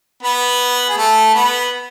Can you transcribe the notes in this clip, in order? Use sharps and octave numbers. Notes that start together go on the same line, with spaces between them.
B3 B4
G#4
A3 A4
B3 B4